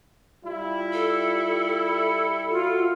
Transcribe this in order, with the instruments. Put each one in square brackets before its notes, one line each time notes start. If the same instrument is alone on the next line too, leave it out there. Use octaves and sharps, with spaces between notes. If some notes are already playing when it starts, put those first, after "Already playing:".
[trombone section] G3 E4 [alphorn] F4
[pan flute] A4
[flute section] F4 [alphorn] F#4